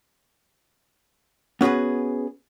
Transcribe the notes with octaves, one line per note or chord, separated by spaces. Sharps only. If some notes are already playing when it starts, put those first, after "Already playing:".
B3 C#4 F#4 G#4 B4